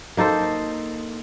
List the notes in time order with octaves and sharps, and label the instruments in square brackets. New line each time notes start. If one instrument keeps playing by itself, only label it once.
[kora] A#3 D#4 A4 C5